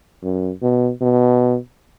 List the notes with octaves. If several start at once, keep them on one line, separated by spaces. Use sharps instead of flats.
F#2
B2
B2